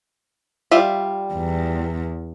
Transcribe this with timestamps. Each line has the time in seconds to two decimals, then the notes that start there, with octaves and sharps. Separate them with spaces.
0.71 G3 F4 E5
1.34 E2